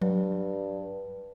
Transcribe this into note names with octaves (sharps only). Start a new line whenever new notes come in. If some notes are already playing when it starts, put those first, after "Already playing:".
G2 F#3